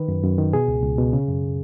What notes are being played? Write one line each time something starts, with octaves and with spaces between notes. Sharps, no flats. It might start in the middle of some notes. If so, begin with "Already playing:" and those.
Already playing: D#3 B4
F#2
F#2
D#3
B2 G#4
C#2
C#2
B2
C#3
F#2